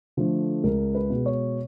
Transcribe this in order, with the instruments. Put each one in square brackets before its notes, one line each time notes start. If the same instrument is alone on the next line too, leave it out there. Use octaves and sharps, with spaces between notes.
[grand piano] D3 F3 A3 A4
C#2 A#4
B4
B2 G#3
C#5